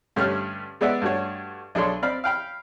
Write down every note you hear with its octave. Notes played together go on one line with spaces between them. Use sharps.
G2 D3 A3 C#4 G4 F6
G#3 B3 D5 E5 F#5
G2 A3 D4 F#4 C#5
B1 D4 G#4 A4 C#5 C6
C4 D5 F5 B5
F5 G5 B5 F6